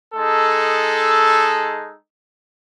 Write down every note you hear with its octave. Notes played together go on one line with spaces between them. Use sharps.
G#3 D#4 A4